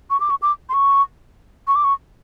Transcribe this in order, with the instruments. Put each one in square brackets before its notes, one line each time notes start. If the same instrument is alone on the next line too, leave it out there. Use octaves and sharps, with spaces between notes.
[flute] C#6
D6
C#6
D6
C6
C#6
C#6
D6
C#6